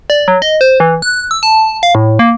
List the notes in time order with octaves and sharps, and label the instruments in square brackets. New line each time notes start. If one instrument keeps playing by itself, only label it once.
[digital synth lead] D5
F#3
D#5
C5
E3
F#6
E6
A5
F5
A2
A#3